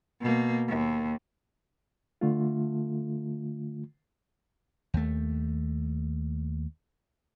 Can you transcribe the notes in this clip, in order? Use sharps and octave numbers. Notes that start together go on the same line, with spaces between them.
B2 A#3
D#2
D3 A3 F4
D#2 A3